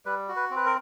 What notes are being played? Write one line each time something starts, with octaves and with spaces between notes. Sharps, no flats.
G3 B4
F#4
B4
C4
B4
A#4